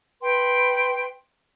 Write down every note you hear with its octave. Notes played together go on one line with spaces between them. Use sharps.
B4 G5 C6